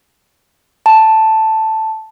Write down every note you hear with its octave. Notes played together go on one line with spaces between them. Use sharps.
A5